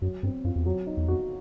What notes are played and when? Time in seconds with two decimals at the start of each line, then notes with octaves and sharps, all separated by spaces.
0.02 F#2 F#3
0.23 G2 C4
0.44 F#2 F4
0.56 E2
0.66 F2 F#3
0.87 D#4
0.97 E2
1.08 F2 F#4